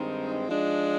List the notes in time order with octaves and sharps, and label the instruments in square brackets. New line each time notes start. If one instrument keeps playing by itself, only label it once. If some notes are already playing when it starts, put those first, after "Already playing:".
Already playing: [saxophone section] G2 D#3 G#3 C4 [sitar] D#4
[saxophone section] F3 G#3 D4